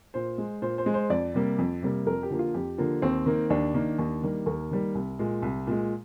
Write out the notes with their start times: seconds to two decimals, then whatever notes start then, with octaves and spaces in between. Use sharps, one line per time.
0.14 A#2 C5
0.38 G#3
0.62 A#2 C5
0.78 C5
0.86 G#3
0.94 C5
1.10 F2 D5
1.34 C3 G3 A#3
1.58 F2
1.82 C3 G3 A#3
2.06 F2 A#4
2.23 G4
2.30 D3 F3 A#3
2.39 F4
2.54 F2 G4
2.78 D3 F3 A#3
3.02 D#2 C4
3.26 D#3 A#3
3.50 D#2 D4
3.74 D#3 A#3
3.99 D#2
4.23 D#3 G3 A#3
4.46 D#2 A#4
4.71 D#3 G3 A#3
4.95 C2
5.19 A#2 G#3
5.42 C2
5.67 A#2 G#3